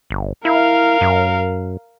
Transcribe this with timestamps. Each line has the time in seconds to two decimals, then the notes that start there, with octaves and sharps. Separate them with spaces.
0.10 G1
0.45 E4 A#4 F5
1.01 F#2